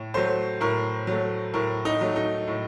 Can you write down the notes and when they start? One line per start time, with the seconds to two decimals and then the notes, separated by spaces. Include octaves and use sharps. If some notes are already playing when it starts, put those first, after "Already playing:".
Already playing: A2
0.14 F#3 A3 C5
0.61 A2 A#4
1.07 F#3 A3
1.54 A2 A#4
1.85 D#4
2.01 F#3 A3
2.16 D#4
2.47 A2